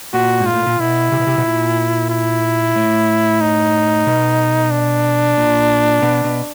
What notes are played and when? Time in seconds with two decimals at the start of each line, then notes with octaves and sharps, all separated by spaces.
0.14 A#2 F#4
0.40 G#2
0.46 F4
0.53 A2
0.67 A#2
0.79 B2 E4
1.12 C3
1.19 B2
1.27 C3
1.38 B2
1.45 A#2
2.10 E4
2.76 A2
3.41 D#4
4.07 B2
4.71 D4
5.37 A#2
6.02 B2
6.24 B2